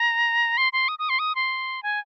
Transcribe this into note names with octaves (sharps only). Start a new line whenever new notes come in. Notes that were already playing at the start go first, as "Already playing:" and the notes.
Already playing: A#5
C6
C6
D#6
D#6
C6
D#6
C6
G#5